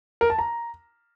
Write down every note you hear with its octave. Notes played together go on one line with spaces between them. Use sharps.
A#4
A5
A#5